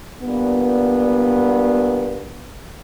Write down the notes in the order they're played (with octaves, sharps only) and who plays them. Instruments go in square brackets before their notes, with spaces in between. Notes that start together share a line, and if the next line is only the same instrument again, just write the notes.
[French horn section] G2 A#2 B3